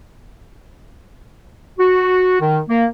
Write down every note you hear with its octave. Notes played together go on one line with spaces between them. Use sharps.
F#4
D#3
A#3